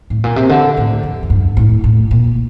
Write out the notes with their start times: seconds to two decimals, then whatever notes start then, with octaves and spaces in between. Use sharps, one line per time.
0.10 A2
0.24 A#2
0.36 C3
0.49 D3
0.77 A2
1.03 F2
1.23 F2
1.30 G2
1.57 A2
1.84 A2
2.11 A#2